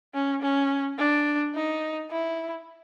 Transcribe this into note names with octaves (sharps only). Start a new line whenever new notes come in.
C#4
C#4
D4
D#4
E4